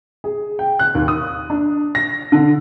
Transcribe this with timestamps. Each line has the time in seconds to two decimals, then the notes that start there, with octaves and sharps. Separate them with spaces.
0.24 G#4
0.59 G5
0.79 F#6
0.95 D#2
1.08 D#6
1.50 D4
1.95 A#6
2.32 D3